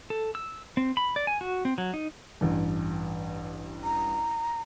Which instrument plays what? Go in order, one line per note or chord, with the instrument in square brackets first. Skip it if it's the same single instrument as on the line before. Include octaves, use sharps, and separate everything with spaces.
[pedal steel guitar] A4
E6
C4
B5
D5
G#5
F#4
C4
F#3
D#4
[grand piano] A1 G2
[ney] A#5